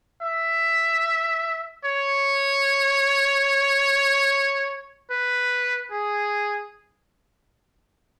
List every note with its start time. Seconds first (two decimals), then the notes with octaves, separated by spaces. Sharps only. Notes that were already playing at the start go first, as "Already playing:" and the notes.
0.22 E5
1.85 C#5
5.11 B4
5.91 G#4